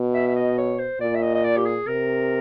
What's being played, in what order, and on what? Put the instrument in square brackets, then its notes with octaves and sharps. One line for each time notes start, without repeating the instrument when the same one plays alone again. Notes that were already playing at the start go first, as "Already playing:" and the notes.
Already playing: [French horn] B2
[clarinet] E5
E5
D#5
C#5
C5
[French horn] A#2 [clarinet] D5
[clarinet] E5
D#5
D#5
D5
G4
G#4
[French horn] C3 [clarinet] A#4